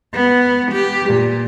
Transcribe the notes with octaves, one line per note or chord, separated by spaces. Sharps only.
B3
G4
A#2